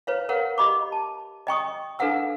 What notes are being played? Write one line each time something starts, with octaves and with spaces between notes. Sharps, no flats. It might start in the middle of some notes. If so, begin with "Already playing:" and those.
B4 C#5 F5
A#4 B4 C#5 F5 F#5
G4 D#5 B5 D6
A5
D#5 G5 C#6 D#6
D4 A4 B4 F5 F#5 E6